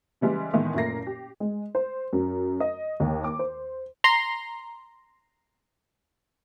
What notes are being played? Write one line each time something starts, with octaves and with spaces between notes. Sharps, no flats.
C#3 E3 G3 G#3
A2 D#3 E3 G#3 B3
F#1 A#2 A3 A#4 A#6 C7
G4
G#3
C5
F#2
D#5
D#2
D6
C5
A#5 C6